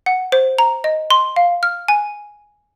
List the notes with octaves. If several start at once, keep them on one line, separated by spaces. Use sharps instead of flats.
F#5
C5
A#5
D#5
C6
F5
F6
G#5